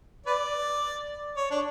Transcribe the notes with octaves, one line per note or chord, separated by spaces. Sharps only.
B4 D5
C#5
D4